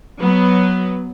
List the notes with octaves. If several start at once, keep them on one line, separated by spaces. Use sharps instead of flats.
F#3 B3